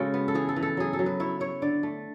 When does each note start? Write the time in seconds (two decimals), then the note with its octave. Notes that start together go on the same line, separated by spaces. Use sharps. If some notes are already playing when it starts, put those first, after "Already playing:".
Already playing: C#3 G#3 F#4 A4 B4
0.14 B3
0.28 A4
0.35 E3 G#4
0.49 A4
0.56 E3
0.63 A4
0.77 F#3 G#4
0.93 A4
0.99 F#3
1.06 B4
1.20 E4 C#5
1.40 E4 C#5
1.62 D3 D5
1.83 A3